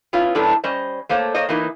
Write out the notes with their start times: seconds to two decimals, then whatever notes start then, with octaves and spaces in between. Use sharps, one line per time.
0.13 B3 C#4 E4 F4
0.35 F#2 A2 A3 B3 D4 E4
0.64 G3 C#4 C5 D#5
1.09 A3 A#3 C5 C#5
1.34 A#3 C5 C#5 D#5
1.49 E3 A#3 B3 D#4 E4